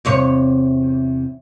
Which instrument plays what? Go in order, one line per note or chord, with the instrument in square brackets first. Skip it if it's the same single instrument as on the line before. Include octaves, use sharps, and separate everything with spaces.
[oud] E2 C3 C#5